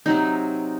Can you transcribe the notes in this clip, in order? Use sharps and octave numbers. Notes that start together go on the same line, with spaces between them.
C3 F#3 C4 D#4